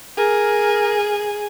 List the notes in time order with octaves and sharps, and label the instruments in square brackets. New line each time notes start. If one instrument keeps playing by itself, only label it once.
[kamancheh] G#4 [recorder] A#4